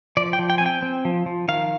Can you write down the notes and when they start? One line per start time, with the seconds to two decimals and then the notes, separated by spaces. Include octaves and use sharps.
0.17 F3 D5
0.33 G5
0.39 F3
0.50 G5
0.58 G#5
0.61 C4
0.66 G5
0.82 C4
1.05 F3
1.26 F3
1.48 D#3 F5